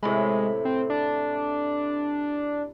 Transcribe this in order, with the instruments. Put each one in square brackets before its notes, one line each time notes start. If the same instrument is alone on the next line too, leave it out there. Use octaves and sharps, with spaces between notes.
[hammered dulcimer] A2 C3 B5 [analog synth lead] G#3
[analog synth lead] C4
D4